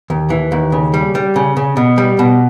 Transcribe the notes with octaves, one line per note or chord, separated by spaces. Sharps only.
D#2
E3
D#2
C#3
G3
G3
C#3
C#3
B2
G3
B2